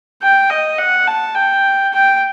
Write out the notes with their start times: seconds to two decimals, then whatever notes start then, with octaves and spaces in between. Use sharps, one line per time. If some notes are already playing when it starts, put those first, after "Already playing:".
0.22 G5
0.50 D#5
0.78 F#5
1.08 A5
1.35 G5
1.93 G5